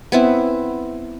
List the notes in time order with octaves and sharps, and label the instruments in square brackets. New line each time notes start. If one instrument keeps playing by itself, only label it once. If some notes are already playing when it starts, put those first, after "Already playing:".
[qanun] B3 C4 E4